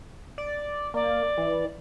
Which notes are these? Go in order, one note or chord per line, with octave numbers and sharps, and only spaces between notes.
D5
A#3 D5
E3